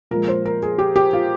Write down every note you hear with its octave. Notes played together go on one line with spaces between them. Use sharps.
A#2 F3 G#3 A#4
C5
A#4
G#4
G4
G4
F4